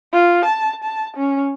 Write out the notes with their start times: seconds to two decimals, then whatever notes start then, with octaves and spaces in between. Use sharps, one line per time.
0.12 F4
0.45 A5
0.84 A5
1.16 C#4